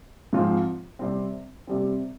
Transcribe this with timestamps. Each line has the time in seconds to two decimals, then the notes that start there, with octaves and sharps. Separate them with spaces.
0.33 G#2 F3 C4 F4
0.99 C3 G3 C4
1.67 C3 G3 C4